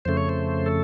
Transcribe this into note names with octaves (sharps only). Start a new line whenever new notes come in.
F2 C#3 A3 C5
C#5
C5
A4